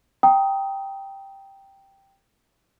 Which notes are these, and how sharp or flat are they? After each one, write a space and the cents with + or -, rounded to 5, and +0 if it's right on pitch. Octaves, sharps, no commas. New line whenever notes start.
G5 +0 A#5 +0 D#6 +15